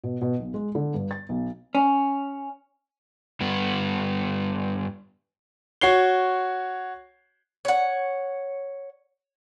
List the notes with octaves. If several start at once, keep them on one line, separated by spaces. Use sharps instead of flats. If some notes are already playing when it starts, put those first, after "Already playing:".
B2
B2
B1
G#3
D3
G2
A6
B1
C#4
G2 B3
F#4 C#5 C7 G7
C#5 F#5